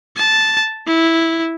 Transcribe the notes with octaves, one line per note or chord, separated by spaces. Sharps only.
A5
E4